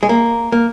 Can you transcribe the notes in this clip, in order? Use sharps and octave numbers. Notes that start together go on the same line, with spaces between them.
G#3
A#3
A#3